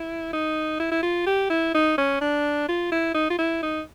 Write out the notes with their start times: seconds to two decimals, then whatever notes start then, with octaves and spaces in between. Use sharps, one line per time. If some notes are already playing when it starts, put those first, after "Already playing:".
Already playing: E4
0.33 D#4
0.80 E4
0.92 E4
1.03 F4
1.26 G4
1.50 E4
1.74 D#4
1.98 C#4
2.21 D4
2.68 F4
2.92 E4
3.14 D#4
3.30 F4
3.39 E4
3.62 D#4